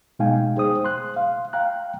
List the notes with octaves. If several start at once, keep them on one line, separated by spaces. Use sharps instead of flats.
B2 G#3 D#4 F5 G5 G#5
G#4 C5 D#6
C6 F#6
F5
F5 G5 A#5 F#6